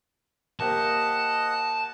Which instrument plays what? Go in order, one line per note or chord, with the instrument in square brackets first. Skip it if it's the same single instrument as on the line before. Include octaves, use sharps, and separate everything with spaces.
[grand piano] A#3 G4 C5 [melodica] D#5 F#5 [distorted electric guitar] A5